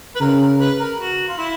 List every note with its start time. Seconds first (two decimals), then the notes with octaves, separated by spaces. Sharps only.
0.15 B4
0.20 C#3 A#4
0.40 A#4
0.59 B4
0.79 A#4
0.98 F#4
1.28 F4
1.37 E4